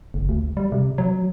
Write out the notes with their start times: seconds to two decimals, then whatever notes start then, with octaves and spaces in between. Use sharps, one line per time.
0.14 F#1
0.29 D2
0.57 G3
0.72 C3
0.98 F#3